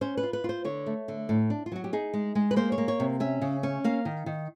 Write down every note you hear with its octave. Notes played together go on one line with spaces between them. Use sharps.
C#4 C5
B4
F4
B4
F4 C5
D3 C#5
A3
D3
A2
D4
F4
F#3 F#4
G4
D#4 G#4
G#3
G#3
B4
A#3 C5
C#5
A#3
C#5
C3
C#4 E5
C#3
C#4
A#3 F5
D#3
D#3